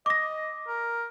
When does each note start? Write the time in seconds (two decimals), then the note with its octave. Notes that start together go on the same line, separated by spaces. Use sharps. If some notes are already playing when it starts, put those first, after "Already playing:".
0.06 D#5 D6 A#6
0.68 A#4